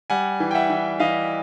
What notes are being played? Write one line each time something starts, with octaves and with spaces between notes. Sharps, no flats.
G3 F#5 G#5
E3
G5
E5 F#5
E3
E3 D#5 F5